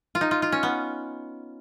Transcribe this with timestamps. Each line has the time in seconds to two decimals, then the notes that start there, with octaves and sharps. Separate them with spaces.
0.15 F4
0.21 D#4
0.31 F4
0.42 F4
0.52 C#4
0.63 B3